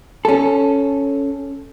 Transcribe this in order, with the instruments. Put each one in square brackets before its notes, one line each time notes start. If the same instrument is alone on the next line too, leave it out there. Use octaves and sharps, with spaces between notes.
[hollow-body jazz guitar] C#4 A4